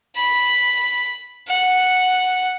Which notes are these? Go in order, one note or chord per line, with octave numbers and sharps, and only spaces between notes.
B5
F#5